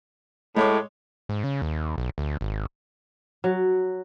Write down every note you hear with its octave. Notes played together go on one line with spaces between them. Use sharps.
A2 G#3 C#5 D6
G#2
C#3
D#2
B1
D2
G#1
F#3